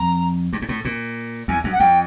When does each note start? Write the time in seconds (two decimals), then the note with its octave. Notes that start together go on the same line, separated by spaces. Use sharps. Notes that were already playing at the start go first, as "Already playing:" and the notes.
Already playing: F2 A#5
0.53 G2
0.62 G#2
0.69 A2
0.85 A#2
1.48 E2 G#5
1.64 F#2
1.73 F#5
1.79 F2 G5